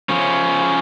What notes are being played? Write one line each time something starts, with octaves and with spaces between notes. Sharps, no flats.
F3 C#4